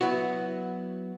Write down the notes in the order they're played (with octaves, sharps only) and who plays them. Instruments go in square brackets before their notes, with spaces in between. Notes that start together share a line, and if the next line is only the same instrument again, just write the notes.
[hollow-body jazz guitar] F#3 B3 E4 F#4